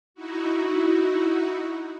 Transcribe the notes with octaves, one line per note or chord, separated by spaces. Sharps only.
D#4 E4 F#4